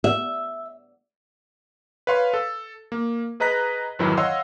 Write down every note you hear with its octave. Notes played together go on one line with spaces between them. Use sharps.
E5
B4 C#5 F5 C6
A4
A#3
G#4 B4 D#5 A#5 F#6 B6
F2 G#2 D#3 E3 F#3 E4
C#5 D#5 F5 F#5 C6 E6